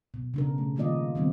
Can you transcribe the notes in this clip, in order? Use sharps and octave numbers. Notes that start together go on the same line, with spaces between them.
B2
C#3 D4 A#4
B2 A3
D#3 G3 A#3 F4 D5 D#5
D#3 G3 B3 C4 D#4